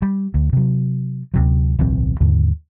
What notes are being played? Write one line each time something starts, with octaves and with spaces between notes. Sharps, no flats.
G3
D2
C3 F#3
D2 C3 F#3
D1 B1 E3 C4
D#2 G#2 D3